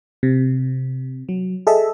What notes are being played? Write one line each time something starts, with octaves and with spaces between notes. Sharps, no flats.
C3
F#3
G#4 A4 D#5 E5